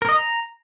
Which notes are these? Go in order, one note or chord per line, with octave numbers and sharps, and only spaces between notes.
A#4
D#5
A#5